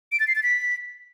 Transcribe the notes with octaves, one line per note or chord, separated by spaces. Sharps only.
D7
A6
C7
A6
B6